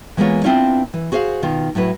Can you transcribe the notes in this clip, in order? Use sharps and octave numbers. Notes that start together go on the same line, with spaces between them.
E3 G#3 A#3 B3 F4 C#5
B3 C4 D4 E4 F4 C#5
E3
F#4 G#4 C5 E5 F5
B2 D#3 F4
A2 F#3 E4 B4